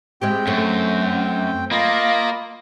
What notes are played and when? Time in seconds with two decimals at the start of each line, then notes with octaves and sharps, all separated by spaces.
0.22 G#3 C4 E4 G4 G5
0.47 F#2 F#3 A3
1.71 A#3 F4 D#5 B5